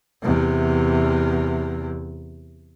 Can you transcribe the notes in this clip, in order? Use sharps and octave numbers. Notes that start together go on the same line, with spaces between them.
E2 C3